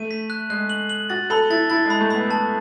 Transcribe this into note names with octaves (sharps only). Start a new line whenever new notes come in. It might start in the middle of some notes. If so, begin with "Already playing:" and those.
Already playing: A3 D#7
B6
F#6
G#3 F#6
F#7
F#7
F#4 A6
A4 B5
E4 A6
E4 A6
G#3
B5
A3
B3 B5
A5